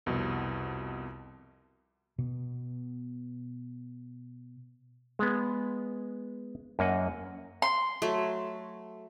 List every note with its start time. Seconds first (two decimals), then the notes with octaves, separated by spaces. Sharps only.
0.06 C2 F2 B2
2.18 B2 B3
5.19 G#3 B3
6.79 F#2 A#3 D#5 F#5
7.62 C6
8.02 F#3 A3